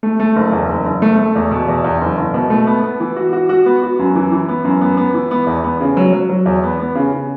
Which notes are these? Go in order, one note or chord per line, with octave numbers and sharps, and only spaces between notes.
A3
A3
F#1
E2
F#1
F#1
A3
A3
E2
B2
E2
E2
F#1
F#1
B2
A3
B3
B3
E3
F#4
F#4
F#4
B3
F#4
F#2
E3
E3
B3
F#2
B3
B3
E3
B3
E2
B3
C#3
F#3
F#3
F#3
E2
B3
B3
C#3
C#3